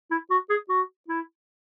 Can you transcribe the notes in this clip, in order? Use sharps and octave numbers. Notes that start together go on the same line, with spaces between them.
E4
F#4
G#4
F#4
E4